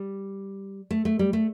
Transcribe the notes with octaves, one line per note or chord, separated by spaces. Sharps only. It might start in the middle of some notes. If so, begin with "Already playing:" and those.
Already playing: G3
A3
A3
G3
A3